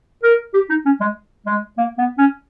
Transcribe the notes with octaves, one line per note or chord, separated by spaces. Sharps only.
A#4
G4
D#4
C#4
G#3
G#3
A#3
B3
C#4